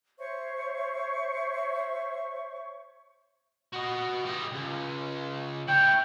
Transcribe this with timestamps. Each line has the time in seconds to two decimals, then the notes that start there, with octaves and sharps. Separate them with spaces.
0.19 C5 C#5 E5 C#6
3.73 F#4 D#5
4.25 G3 D#5
4.53 C#2
5.68 E4 C#5 G5